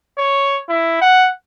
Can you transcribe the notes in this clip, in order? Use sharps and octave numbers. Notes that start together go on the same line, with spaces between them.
C#5
E4
F#5